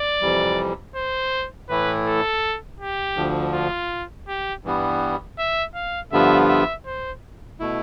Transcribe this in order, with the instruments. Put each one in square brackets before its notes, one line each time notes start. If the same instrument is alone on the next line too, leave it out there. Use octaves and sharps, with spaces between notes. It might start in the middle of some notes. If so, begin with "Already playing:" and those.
Already playing: [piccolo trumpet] D5
[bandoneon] F2 C3 E3 G3
[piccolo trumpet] C5
[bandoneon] A2 E3 A3 E4 [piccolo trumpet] B4
[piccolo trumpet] A4
G4
[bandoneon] D2 D3 F3
[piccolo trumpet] F4
G4
[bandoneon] G2 E3 G3 B3
[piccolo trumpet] E5
F5
[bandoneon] G2 D3 F3 B3 F4 [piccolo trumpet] E5
[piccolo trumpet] E5
C5
[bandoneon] B2 A3 E4